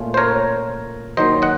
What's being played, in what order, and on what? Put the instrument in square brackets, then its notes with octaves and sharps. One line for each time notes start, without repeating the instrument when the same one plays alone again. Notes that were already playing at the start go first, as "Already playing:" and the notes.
Already playing: [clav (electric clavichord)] A#2 A3 C#4 F4
C5
A#4 C#5
D#2 D#3 F#3 C5 D#5
D#5 F#5